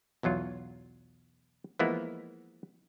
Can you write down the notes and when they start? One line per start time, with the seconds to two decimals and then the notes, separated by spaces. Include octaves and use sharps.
0.23 B1 E2 F#3 F4
1.79 E3 F3 G#3 A#3 B3 E4